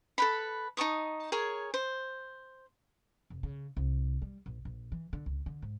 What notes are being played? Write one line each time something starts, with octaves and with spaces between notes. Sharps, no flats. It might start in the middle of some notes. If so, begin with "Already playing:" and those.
A4 B4 B5
D#4 A5 C#6 D#6
G#4 A#4 C#5
C5
F1
C#3
C2
G3
A#1
A#1
E3
D3
C#2
D3
G#2